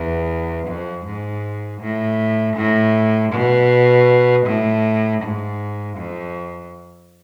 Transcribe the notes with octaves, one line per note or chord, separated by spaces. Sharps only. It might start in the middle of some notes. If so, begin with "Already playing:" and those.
Already playing: E2
F2
G#2
A2
A2
B2
A2
G#2
F2